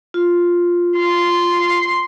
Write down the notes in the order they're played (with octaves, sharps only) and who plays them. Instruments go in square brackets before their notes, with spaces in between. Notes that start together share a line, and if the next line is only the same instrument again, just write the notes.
[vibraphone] F4
[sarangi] C6